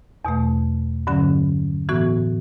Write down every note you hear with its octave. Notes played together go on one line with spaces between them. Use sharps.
E2 B2 A3
G2 D3 F#3 C#4
A2 E3 B3 F#4